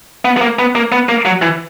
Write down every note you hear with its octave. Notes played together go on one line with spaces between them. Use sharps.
B3
B3
A#3
B3
A#3
B3
A#3
F#3
E3